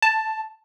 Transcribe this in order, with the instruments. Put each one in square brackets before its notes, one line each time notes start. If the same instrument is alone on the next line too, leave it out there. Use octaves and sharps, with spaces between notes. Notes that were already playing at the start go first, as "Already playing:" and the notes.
[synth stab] A5